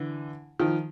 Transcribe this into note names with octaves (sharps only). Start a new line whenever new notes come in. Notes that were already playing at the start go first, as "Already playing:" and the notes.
Already playing: D3 E3
D#3 F3